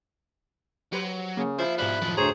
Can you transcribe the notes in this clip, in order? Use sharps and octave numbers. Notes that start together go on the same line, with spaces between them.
F#3 G4 B4 C5
C#3 A#3
F3 E4 C5
G#2 B2 G3 E4 B5 F#6 E7
F#2 A2 D#3 F3
D2 G#4 C5 C#5 A#5